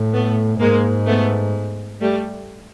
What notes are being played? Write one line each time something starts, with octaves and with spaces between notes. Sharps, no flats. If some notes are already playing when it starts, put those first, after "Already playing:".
Already playing: A2
A3 B3
G#2 G#3 A#3
A3 B3
G3 A3